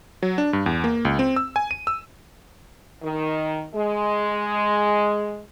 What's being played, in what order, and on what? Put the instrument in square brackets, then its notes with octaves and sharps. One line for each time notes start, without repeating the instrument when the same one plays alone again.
[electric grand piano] F#3
D4
G2
E2
A#3
C#2
C4
E6
G#5
D#7
E6
[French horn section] D#3
G#3